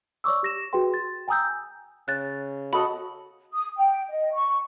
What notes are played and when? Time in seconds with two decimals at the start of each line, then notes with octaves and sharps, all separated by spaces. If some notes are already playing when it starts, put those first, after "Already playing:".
0.24 C#5 D5 C#6 D6 E6
0.43 G4 A#6 E7
0.73 F#4 G#4 B4 G5 C6
0.94 A6
1.28 G5 G#5 A#5 D#6 E6 G6
2.08 C#3 F#6 A6
2.73 F#4 A4 D#5 B5
3.53 D#6
3.77 G5
4.11 D#5
4.33 C#6